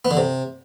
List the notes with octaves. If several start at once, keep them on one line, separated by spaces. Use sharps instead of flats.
B3
D3
C3